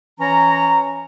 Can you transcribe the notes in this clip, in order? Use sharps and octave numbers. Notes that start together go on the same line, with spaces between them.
E3 C#4 C#5 A#5